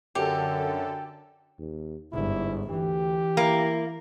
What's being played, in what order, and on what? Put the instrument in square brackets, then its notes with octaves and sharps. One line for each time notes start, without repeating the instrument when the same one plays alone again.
[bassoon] F#2 [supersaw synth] D3 A4 [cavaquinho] G4
[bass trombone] D#2
[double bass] G1 [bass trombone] G#2 [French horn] E4
[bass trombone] D2 [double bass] E3 [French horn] G4
[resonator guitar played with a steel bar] A#3 [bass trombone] E4